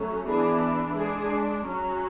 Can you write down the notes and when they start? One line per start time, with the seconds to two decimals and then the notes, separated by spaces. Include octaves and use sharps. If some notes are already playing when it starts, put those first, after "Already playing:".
Already playing: F#3 A3 C#4
0.27 E3 B3 D4 G#4
0.96 G#3 D4 G#4
1.65 F#3 C#4